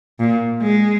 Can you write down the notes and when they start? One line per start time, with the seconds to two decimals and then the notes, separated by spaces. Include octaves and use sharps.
0.19 A#2
0.62 G#3